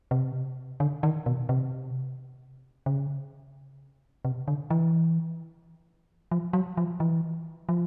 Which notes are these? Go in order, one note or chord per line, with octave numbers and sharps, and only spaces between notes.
C3
D3
D#3
B2
C3
C#3
C3
D3
E3
F3
F#3
F3
E3
F3